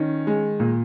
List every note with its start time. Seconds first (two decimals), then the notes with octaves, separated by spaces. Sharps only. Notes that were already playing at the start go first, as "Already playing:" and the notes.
Already playing: D#3 C#4
0.27 G#3
0.60 A#2